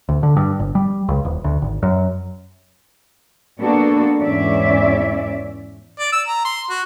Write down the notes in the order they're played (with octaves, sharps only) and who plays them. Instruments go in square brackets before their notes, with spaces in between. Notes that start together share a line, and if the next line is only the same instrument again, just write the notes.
[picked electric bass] D2
D3
G2
G1
G3
C#2
D#1
D2
G#1
F#2
[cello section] A#3 B3 D4 F#4 A4
E2 G#2 C#4 D5 E5
[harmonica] D5
E6
A#5
C6
F#4